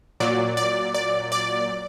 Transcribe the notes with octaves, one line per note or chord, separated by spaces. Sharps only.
A#2 F#3 D5
D5
D5
D5